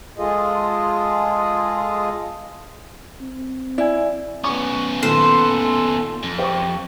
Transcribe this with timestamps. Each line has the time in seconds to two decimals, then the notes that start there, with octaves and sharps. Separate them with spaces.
0.18 G#3 F4 G#4 A4 D#5
3.21 C4
3.78 E4 D5 G#5
4.44 B3 C#4 C#6
5.03 A#2 D#3 A4 C5
6.23 F2
6.39 G4 C5 C#6